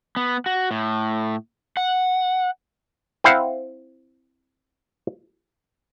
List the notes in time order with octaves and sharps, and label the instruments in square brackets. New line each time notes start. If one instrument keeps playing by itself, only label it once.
[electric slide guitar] B3
F#4
A2
F#5
[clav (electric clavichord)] C4 E4 C5 F5 F#5